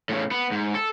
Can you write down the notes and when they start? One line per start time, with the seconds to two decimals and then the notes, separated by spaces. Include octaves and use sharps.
0.09 A2 C#3
0.31 B3
0.52 G#2
0.75 A4